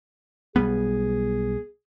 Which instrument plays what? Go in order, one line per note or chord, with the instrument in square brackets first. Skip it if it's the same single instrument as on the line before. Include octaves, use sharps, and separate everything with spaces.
[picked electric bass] B1 G3 B3 [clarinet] G#4